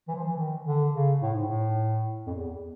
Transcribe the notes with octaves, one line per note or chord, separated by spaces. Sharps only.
E3
F3
E3
D#3
D3
C#3
A2
G#2
A2
F2
E2